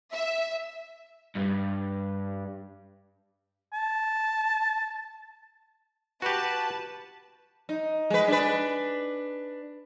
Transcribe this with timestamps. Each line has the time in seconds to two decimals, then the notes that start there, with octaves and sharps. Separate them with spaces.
0.14 E5
1.36 G2
3.73 A5
6.22 F#4 G4 B4 A5
7.69 D#4
8.10 G#3 B4
8.28 D4 B4